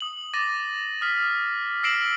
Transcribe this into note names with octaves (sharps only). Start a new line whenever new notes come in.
D#6 F#7
D6 A6 A#6 D#7
D#6 F6 B6
E6 A#6 C7 D7 E7 F#7